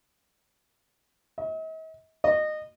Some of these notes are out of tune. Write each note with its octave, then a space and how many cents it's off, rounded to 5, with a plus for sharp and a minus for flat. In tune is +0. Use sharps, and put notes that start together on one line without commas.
D#5 +45
D#5 -25